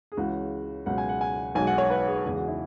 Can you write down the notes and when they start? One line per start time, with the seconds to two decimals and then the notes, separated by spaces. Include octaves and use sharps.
0.12 G#4
0.17 C#2 C#3 E3 F#4
0.86 C#2 B2 F#3 F#5
0.98 G#5
1.09 F#5
1.21 G#5
1.55 B1 B2 G#3 G#5
1.67 F#5
1.78 C#5
1.90 B4
2.07 G#4
2.25 E2 C#3 G#3 G#4
2.36 F#4
2.48 E4